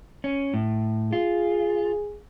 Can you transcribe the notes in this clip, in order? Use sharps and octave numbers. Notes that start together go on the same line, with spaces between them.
C#4
A2
F4 G#4